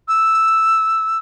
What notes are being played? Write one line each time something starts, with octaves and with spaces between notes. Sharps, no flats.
E6